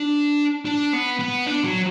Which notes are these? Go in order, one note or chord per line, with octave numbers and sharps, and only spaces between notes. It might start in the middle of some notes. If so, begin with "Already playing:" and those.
Already playing: D4
D4
B3
B3
D4
F#3